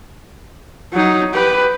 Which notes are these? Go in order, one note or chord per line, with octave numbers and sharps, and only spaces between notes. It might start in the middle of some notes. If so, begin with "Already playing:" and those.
F#3 D#4
G4 B4